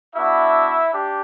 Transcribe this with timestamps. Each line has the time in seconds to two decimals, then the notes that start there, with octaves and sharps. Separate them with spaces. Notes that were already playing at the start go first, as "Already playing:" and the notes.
0.15 B3 D4 E4 F#4 E5
0.92 D4 G4